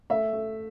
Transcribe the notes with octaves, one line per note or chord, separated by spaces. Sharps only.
A3 E5
A3